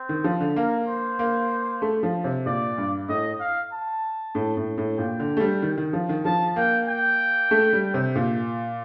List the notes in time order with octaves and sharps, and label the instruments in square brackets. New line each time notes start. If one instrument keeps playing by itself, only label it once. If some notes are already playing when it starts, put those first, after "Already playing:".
Already playing: [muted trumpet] C4
[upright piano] D#3
F3
D3
[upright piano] A#3 [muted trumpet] A#4
[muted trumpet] C5
[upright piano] A#3
A3
F3
C3
[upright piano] A#2 [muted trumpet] D5
[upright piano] G2
[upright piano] A2 [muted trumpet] D#5
[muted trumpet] F5
A5
[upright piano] A2
A2
A2
[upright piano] A#2 [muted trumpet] G5
[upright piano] D3
A3
G3
D#3
D#3
F3
D#3
[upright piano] F3 [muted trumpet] A5
[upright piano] A#3 [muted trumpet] G5
[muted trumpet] G5
[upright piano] A3
G3
C3
A#2